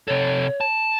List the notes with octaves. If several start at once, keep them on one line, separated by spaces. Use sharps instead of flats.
C3 A4 C#5
A5